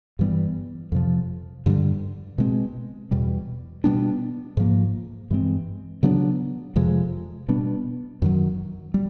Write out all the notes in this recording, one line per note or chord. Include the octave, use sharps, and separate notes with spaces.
G2 E3 G3 B3
F2 C3 F3
G2 D3 G3
B2 G#3 C4
E2 B2 G3
B2 G3 B3 D4
G#2 F3 A#3
G2 E3 G#3 C4
C#3 F#3 B3 D4
F2 C3 F3 G#3
B2 G3 B3 D4
F#2 D#3 F#3
G3